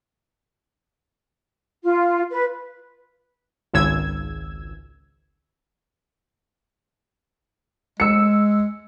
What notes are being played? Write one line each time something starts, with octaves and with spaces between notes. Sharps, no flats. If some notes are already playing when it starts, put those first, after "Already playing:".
F4
B4
G#1 C#2 E6 G#6
G#3 E6 C#7